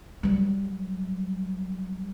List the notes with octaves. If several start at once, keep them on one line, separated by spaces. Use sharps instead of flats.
F#3 G3